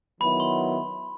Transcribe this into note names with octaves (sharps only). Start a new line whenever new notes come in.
D#3 F#3 B3 E4 B5
C6